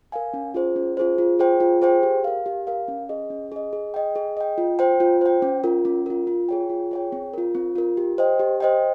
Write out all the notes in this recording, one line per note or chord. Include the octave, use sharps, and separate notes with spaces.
A#4 F5 G#5
C#4
F4 G#4 C5
C#4
F4 G#4 C5
F4
G#4 C5 G5
F4
G#4 C5 G5
G4
A#4 F5
G4
A#4 F5
C#4
G#4 D#5
C#4
G#4 D#5
G#4
D#5 G5
G#4
D#5 G5
F4
C5 G5
F4
C5 G5
C#4
F4 A#4
C#4
F4 A#4
F4
G#4 C#5 G5
F4
G#4 C#5 G5
C4
F4 A#4
C4
F4 A#4
G4
C5 D#5 G5
G4
C5 D#5 G5